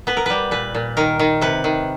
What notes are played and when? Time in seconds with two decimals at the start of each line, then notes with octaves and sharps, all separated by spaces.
0.07 B3 B4
0.17 A#4
0.26 G3 B4
0.51 A#2 B4
0.75 A#2
0.97 D#3 A#4
1.19 D#3
1.41 C3 B4
1.64 D#3